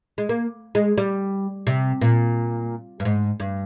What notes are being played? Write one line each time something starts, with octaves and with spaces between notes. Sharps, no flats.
G#3
A#3
G#3
G3
C3
A#2
G2
G#2
G2